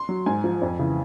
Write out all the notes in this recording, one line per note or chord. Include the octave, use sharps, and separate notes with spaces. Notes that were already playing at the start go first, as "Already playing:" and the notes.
Already playing: C6
F#3
G#2 G#5
F3
F2
C#3 E3